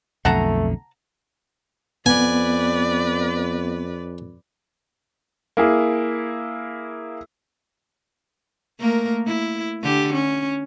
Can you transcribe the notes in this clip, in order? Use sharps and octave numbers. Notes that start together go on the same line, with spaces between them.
B1 F2 D3 A3 F#5 A5 A#5
F2 B3 B4 D5 G#5
A#3 E4 G#4
A3 A#3 A#4
E4
D3 G4
C#4